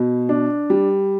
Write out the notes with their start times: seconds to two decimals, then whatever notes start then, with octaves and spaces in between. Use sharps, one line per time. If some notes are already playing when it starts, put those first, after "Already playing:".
Already playing: B2
0.29 D4
0.70 G3